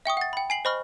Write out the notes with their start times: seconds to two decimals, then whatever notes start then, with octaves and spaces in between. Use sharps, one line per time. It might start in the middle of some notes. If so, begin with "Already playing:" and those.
0.06 E5 G5 C#6 D#6
0.17 F#5 A6
0.33 G5 B5
0.50 G#5 C7 F#7
0.65 C5 D#5 B5 C#6 F6